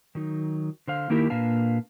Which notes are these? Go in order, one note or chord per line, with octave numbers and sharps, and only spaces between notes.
D#3 F#3 D#4
D3 C5 F5
D#3 A#3 D#4 E4 G4 A#4
A#2 A#3 D4 B4 F5 A5